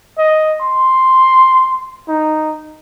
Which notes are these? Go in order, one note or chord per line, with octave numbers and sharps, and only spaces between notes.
D#5
C6
D#4